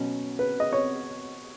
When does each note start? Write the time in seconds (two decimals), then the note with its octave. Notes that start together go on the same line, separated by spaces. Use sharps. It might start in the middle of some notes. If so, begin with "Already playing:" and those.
Already playing: B2 F#3 C#4
0.39 B4
0.60 D#5
0.73 C#5